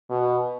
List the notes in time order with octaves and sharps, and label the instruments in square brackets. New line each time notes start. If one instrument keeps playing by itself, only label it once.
[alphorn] B2